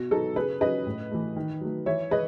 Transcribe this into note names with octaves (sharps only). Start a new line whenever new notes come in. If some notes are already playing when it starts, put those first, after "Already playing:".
Already playing: B2 F#4
F#3 B3 D#4 F#4 A4
C#3 G#4 B4
F#3 C#4 B4 D#5
A2
E3 A3
D#3
F#3 A3
E3 C#5 E5
G#3 B4 D#5